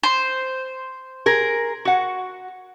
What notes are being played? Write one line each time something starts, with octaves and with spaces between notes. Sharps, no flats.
C5
G#4 A#4
F#4 F#5